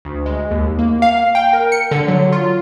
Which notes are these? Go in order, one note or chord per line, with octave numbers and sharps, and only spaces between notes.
D2
G#3
D#2
A#3
F5
G5
A#4
C#7
D3
F#3
F4